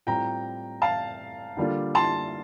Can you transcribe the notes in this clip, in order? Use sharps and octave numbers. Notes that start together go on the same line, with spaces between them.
A2 G3 C4 F4 G5 A#5
F5 A5
D3 G3 A#3 D4 F4
A5 C6